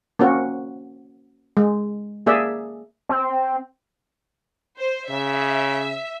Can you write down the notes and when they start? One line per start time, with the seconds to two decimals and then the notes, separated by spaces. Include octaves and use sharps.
0.19 A#3 C4 C#4 F#4
1.57 G#3
2.26 A#3 G#4 D5 E5
3.09 C4
4.78 C5
5.09 C#3 E5